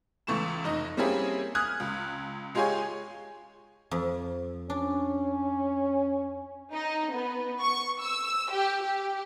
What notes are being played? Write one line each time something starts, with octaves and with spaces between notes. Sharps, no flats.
C#2 E3 A3 C#6 E7
F1 D#4 D#5
G3 A#3 C4 C#4 E4 G#4
G#5 D#6 F6 F#6 G#6
C#2
G#3 F4 G4 G#4 C#5 G#5
F2
C#4 D4
D#4
B3
C#6
E6
G4
G4